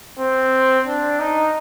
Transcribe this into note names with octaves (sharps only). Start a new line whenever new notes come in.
C4
D4
D#4